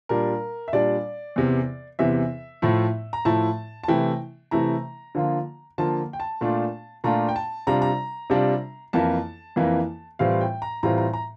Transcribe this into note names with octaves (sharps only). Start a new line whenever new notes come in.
A#2 G3 D4 A#4
E5
A#2 G3 D4 D5
E2 C3 E3
E2 C3 E3 E5
A2 F3 A3 E4
A#5
A2 F3 A3 E4 A5
A5
C3 E3 A3 E4 G5
C3 E3 A3 E4 A#5
D3 F3 A#3 F4
D3 F3 A#3 F4 A5
G5
A5
A#2 A3 D4 F4
A#2 A3 D4 F4 A#5
G5
A5
C3 G3 D4 F4 A#5
A#5
C3 G3 D4 F4
F2 E3 A#3 E4 A5
F2 E3 A#3 E4
A2 E3 G3 C4 F4 F5
G5
A#5
A2 E3 G3 C4 F4 A#5
A#5
A#5